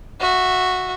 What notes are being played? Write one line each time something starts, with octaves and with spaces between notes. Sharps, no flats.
F#4 E5